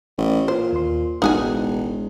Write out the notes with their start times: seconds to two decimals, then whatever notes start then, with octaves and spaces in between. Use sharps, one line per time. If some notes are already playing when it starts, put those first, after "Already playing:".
0.18 A1
0.48 A#2 C5
0.72 D#2 C6
1.22 E1 A1 G#3 D#4 F#4 G#5